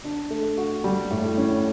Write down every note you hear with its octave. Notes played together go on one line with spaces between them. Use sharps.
D4
A3
F#4
G3
A2
C#4